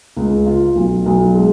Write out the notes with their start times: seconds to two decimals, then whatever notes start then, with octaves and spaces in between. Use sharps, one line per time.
0.17 C#2
0.46 F4
0.75 B1
1.06 B1
1.35 G#3